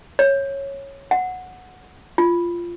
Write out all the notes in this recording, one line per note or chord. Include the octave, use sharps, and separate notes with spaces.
C#5
F#5
F4